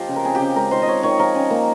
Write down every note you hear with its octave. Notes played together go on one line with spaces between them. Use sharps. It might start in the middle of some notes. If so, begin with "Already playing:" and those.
Already playing: F3 A#3 F4 G4 D#5
C#3
A#4
C4 G#4
C#3 G4
G#3 A#4
D#3 C5
D#5
C4 C#5
D#3 C#5
F3 A#4
C#4
A#3